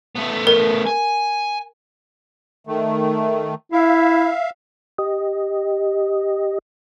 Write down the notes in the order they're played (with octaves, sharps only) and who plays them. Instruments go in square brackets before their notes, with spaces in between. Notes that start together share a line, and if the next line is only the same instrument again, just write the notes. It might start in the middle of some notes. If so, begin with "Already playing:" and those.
[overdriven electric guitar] A3 B3
[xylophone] A#4
[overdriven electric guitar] G#5
[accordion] D#3 A3
[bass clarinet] E4 [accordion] E5 F5
[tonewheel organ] G4 D#5